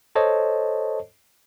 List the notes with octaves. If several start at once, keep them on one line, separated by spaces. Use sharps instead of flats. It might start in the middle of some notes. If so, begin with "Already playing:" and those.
A4 C5 C#5 D#5 A5